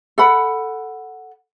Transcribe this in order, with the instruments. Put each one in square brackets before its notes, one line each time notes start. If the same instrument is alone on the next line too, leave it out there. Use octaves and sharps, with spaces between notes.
[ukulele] A4 F#5 B5